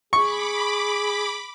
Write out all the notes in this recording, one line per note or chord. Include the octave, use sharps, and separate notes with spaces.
G#4 B5 C#6 D6